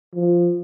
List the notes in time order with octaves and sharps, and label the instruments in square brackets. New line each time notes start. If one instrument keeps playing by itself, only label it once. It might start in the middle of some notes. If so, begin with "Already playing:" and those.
[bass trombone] F3